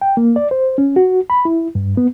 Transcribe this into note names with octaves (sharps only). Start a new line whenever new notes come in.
G5
A#3
D5
C5
C#4
F#4
B5
E4
G2
B3